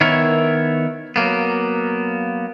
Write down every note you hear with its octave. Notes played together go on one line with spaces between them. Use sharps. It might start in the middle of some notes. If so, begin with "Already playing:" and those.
D#3 B3 E4 A#4 C#5
F#3 A#3 B3